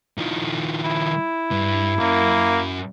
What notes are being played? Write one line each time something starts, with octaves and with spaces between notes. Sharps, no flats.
D#3 F3
E4
G2
F#2 A#3